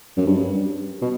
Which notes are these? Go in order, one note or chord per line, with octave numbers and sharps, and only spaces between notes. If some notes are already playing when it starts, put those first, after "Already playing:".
F#2
G2
B2